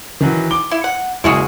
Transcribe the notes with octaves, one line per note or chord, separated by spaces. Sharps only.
D#3 E3 F#3
D6 G7
E4
F#5
F#1 G#3 E4 F#4 G#4 C#6